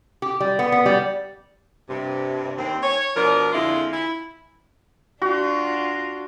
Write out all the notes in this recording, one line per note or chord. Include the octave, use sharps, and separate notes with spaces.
G4
G3
B3
B3
G3
G2 C3
D#2 C4
C#5
B2 F3 D4 A#4
F2 D3 G#3 E4 F4
E4
D4 F4 F#4